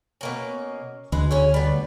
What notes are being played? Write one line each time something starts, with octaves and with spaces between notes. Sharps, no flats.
B2 A#3 C#4
D2 G#3 B4
C#4 G#4 C#5
G3 B3